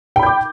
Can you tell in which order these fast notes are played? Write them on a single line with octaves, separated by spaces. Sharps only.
G5 B5 G6 D6